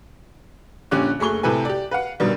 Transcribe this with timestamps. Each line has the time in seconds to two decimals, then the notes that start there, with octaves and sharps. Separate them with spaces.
0.91 A#1 D3 C#4 G4 D6 F#6
1.19 F#1 A3 G#4 C#6 G7
1.43 A2 C3 A4 B4 G#5
1.65 G4 D5
1.91 B4 F5 F#5
2.20 G#2 B2 D3 D#3 F#3 G3